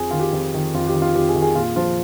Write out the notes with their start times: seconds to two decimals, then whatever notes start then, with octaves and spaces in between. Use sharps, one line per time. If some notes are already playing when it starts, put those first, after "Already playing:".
Already playing: F2 G#4
0.11 D#3 F4
0.20 G4
0.33 F2
0.54 D#3
0.74 F2 F4
0.87 G4
0.94 D#3
1.02 F4
1.15 F2 G4
1.28 G#4
1.35 D#3
1.42 G#4
1.55 A#2 F4
1.76 F3 F4